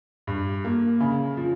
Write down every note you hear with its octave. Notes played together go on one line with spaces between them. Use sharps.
G2
A#3
C#3
F3